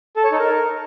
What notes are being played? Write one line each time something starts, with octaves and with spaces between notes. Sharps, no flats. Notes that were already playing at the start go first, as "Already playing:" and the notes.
A4
C#5
D#4
A#4